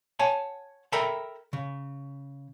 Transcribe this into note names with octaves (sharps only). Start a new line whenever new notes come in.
C#5 F#5 G#5 A5
A4 A#4 E5 G5 A#5 B5
C#3